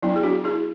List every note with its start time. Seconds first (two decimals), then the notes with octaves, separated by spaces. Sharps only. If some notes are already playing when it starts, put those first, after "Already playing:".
0.03 F#3 B3 D4 E4
0.16 G#4
0.23 D4 F#4
0.44 E4 G#4